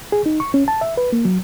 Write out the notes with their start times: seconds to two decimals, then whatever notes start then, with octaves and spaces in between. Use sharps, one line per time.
0.12 G#4
0.26 D#4
0.40 C#6
0.54 C#4
0.68 A5
0.81 E5
0.97 B4
1.12 A#3
1.25 F#3